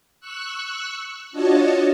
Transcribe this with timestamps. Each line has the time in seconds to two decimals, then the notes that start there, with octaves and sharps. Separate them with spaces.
0.20 C#6 E6 F#6
1.32 D4 F4 F#4 C#5 D#5 A5